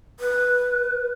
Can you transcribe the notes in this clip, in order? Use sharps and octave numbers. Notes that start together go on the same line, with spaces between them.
B4